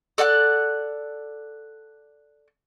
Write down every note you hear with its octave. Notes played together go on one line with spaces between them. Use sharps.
A4 D5 F#5 F#6